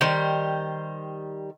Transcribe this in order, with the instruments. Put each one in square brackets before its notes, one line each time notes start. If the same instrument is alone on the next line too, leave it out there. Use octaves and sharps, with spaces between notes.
[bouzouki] D#3 G3 C5